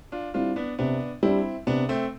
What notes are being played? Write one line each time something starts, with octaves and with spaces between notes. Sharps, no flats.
D4 F4
G3 C4 D4 E4 F4
B3 D4
C3 B3 D4
G3 C4 D4 E4
C3 B3 D4
A3 C4